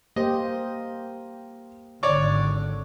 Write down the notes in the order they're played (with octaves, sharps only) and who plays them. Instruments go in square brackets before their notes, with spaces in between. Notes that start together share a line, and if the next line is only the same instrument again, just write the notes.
[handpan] A#3 G4 C5 [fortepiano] D#5
[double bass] G#1 D3 [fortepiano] C#5 D5 C#6